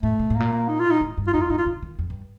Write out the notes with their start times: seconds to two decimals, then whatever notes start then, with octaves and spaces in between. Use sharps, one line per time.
0.03 A2 A3
0.19 A#2
0.30 A2
0.36 A#2 A#3
0.53 A#3
0.68 D#4
0.79 F4
0.91 D#4
1.01 A2
1.18 G2
1.27 F4
1.34 F2 D#4
1.41 F4
1.50 G2 D#4
1.58 F4
1.66 D3
1.83 D#3
1.99 F2
2.10 G2